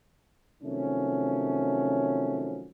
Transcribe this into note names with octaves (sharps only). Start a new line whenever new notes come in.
C3 D#3 F3 F#3 A3 C#4